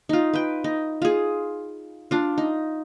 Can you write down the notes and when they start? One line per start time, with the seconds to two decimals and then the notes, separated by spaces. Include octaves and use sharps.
0.09 D#4 F4
0.33 B4 G5
0.64 D#4
1.02 F4 G#4
2.11 D4 F4
2.38 D#4